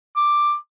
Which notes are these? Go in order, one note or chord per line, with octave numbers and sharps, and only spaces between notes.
D6